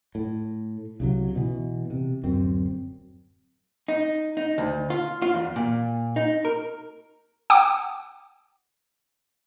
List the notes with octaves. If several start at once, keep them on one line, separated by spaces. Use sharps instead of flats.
A2
C2 C#3 F#3
B2 E3
C3
D1 F#2 C4
D#4
D#4
D2
F4
F4
E2
A#2
D#4
A#4
F#5 G5 D6 D#6